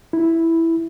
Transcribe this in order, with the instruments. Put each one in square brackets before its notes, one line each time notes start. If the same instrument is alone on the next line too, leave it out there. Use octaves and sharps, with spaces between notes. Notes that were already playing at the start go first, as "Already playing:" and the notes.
[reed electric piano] E4